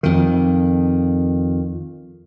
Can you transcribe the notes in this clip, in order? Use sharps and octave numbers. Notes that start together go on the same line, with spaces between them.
F2 D#3